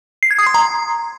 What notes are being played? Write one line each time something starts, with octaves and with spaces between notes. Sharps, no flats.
C7
G#6
D#6
C6
A#5